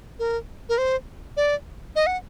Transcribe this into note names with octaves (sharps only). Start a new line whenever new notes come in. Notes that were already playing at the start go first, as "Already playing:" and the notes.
A#4
A#4
C5
D5
D#5
F#5